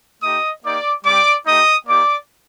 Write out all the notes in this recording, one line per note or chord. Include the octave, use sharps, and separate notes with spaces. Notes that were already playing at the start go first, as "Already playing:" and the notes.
A3 D#4 G4 D#5 D#6
A#3 D#4 G4 D5 D6
G3 C4 G4 D5 D6
A3 D#4 G4 D#5 D#6
A#3 D#4 G4 D5 D6